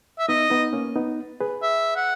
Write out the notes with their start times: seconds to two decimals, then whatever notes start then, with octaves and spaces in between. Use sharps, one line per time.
0.19 E5
0.28 B3 D#4 D#5
0.50 B3 D#4
0.73 A#3 C#4
0.96 B3 D#4
1.41 G#4 B4
1.63 E5
1.96 F#5